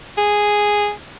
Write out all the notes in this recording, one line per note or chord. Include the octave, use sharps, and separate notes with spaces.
G#4